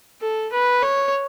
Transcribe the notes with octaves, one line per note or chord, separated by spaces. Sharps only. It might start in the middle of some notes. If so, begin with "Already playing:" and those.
A4
B4
C#5